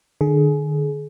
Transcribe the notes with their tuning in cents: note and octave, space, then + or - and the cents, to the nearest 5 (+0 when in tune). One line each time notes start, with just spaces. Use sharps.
D3 +40 G#4 +25